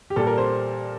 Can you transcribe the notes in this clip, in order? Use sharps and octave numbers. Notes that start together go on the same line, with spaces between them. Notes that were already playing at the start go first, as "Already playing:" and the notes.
G4
A#2 G3 A4
A#4
C5